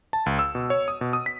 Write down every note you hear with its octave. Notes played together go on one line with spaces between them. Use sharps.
A5
C#2
E6
B2
C#5
D#6
B2
D#6
B6